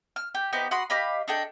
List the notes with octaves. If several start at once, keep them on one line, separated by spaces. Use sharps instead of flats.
F6
G4
B3 D#4 G4 C5
F#4 B5 C6 D#6
G4 D#5 F5 B5
D4 D#4 A4 G5